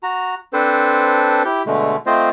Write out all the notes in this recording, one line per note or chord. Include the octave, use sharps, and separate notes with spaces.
F#4 A#5
C4 D4 A4 B4 C5
E4 G4 G6
B2 D3 G#3 A3
A3 C4 F4 C5 D#5